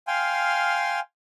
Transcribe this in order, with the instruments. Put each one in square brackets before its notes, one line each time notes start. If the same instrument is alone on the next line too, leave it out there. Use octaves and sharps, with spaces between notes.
[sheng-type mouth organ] F5 G5 G#5 C6 F6